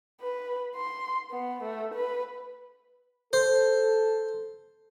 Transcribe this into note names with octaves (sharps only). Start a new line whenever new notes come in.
B4
C6
B3
A3
B4
A4 C5